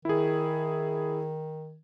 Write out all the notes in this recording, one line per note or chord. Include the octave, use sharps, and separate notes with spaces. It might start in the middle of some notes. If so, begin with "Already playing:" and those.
D#3 E4 G#4